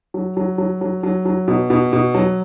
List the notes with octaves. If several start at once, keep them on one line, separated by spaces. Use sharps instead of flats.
F#3
F#3
F#3
F#3
F#3
F#3
B2
B2
B2
F#3